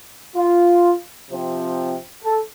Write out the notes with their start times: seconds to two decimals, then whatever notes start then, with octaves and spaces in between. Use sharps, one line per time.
0.35 F4
1.30 C3 F3 C4
2.23 A4